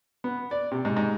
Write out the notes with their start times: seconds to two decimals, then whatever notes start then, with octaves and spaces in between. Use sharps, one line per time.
0.24 B3
0.51 D5
0.72 C3
0.85 G#2
0.97 G#2